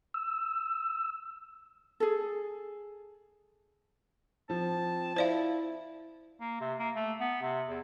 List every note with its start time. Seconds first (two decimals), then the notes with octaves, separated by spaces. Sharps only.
0.14 E6
2.00 G#4 A4
4.50 F3 C4 A5
5.16 E4 C5 D5 F5
6.40 A#3
6.61 C3
6.79 A#3
6.95 A3
7.20 B3
7.42 C3
7.68 E2